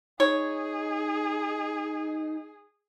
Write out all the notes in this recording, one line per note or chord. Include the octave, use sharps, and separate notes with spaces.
D#4 G#4 C#5